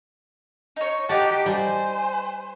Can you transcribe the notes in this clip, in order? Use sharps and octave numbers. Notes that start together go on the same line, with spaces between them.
D#4 C#5
D#4 F#4 G4 A5
G3 C5 G#5